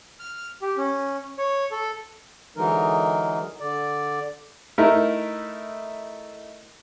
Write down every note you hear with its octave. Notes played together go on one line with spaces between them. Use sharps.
F6
G4
C#4
C#5
A4
D3 E3 F#3 G#3 D#4 A#4
D3 D5
A3 D#4 E4 A#4